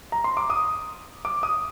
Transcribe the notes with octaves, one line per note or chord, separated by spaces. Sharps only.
A#5
C6
D6
D#6
D6
D#6